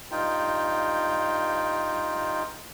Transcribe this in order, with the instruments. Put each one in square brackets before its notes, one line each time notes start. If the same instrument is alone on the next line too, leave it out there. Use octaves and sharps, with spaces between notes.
[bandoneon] G2 D#4 F4 G5